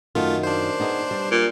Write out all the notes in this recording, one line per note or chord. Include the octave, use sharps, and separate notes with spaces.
F#2 D#3 A3 F4
D4 C5
B3 D#4 G#4
G3
A#2